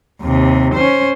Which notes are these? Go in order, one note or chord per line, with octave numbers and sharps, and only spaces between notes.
D#2 C3
C#4 C5